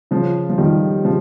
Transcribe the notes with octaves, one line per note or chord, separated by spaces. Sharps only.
C#3 F3
F3
D#3 G3
C#3 F3